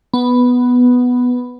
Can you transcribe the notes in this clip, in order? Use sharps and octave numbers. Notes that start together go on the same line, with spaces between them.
B3